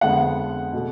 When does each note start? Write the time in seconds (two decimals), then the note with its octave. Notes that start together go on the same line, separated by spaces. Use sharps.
0.01 F2 D3 G#3 B3 F#5
0.73 B2 A3